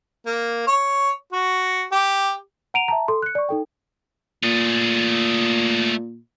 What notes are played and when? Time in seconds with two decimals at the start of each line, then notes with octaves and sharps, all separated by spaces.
0.26 A#3
0.67 C#5
1.32 F#4
1.92 G4
2.74 F#5 A#5 D7 D#7 F7
2.88 E5 A5 A#5
3.08 A4 C6
3.22 F#6 C#7
3.35 D5 C#6
3.49 D#4 A4 G5
4.43 A#2 A3 G#4